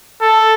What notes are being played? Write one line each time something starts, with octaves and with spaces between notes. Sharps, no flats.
A4